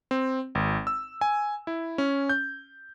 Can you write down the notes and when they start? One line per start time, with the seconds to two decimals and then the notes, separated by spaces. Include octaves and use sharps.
0.11 C4
0.55 G#1
0.87 E6
1.21 G#5
1.67 E4
1.98 C#4
2.29 G6